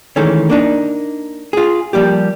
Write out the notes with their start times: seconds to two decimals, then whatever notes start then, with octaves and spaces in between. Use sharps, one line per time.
0.16 D#3 E3 G#3 A3 C#4
0.50 A#3 D4 D#4
1.53 F4 G#4
1.93 F3 G3 A#3 G4